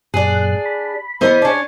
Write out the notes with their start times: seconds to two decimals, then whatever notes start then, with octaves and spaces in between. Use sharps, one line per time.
0.14 F#2 A#2 D4 G#4 F#6
0.66 B5
1.21 E3 A3 B3 G#4 C5 D#5
1.42 C#4 D4